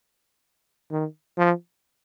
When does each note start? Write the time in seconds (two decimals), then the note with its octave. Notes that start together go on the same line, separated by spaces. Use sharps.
0.91 D#3
1.37 F3